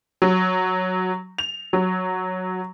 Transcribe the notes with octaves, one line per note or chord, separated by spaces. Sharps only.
F#3
F7
F#3